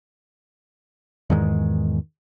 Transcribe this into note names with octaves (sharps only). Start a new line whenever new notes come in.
E2 G#2 D#3 G#3